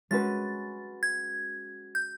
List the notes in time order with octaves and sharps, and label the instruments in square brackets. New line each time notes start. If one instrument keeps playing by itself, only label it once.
[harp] G#3 C#4 F#4 B4 [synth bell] A6
[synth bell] G#6
G6